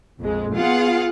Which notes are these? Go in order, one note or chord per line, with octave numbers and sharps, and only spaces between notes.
A#1 F2 G#3
B3 F4 G#4 F5 F#5